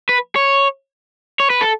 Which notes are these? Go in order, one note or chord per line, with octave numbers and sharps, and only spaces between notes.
B4
C#5
C#5
B4
A4